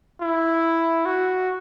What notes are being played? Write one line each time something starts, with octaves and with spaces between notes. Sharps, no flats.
E4
F#4